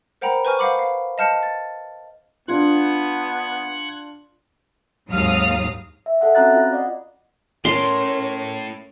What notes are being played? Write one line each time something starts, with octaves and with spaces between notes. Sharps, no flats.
A#4 C5 F#5 G5 A#5 B5
B4 C5 G#5 C#6 F6
C5 F5 F#5 B5 D6
F5
D#5 F5 A5 F6 G6 C#7
A6
B3 D4 F4 F#5 F#6 G#6
G#1 D#2 F#3 F5 D#6 F6
E5
A4 E5 F#5
C4 C#4 F#4 A#5 F#6 A6
F4
D5 D#5 F#5
A2 C#4 A#4 C6